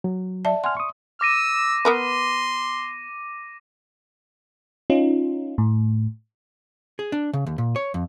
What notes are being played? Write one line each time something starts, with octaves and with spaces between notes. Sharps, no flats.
F#3
D5 E5 A5
F#5 G#5 C6 F6
C#6 D#6
D6 E6 A#6 D#7
B3 A#4 B4 C6
C#4 D#4 F4
A2
G#4
D4
C#3
D#2
A#2
C#5
F2